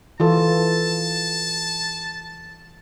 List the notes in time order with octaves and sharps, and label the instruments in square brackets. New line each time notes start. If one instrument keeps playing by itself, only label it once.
[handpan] E3 F4 A4 [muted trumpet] A5